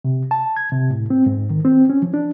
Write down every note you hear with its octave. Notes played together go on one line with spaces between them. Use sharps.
C3
A5
G#6
C3
A2
C4
G#2
D#3
C4
C#4
F3
D4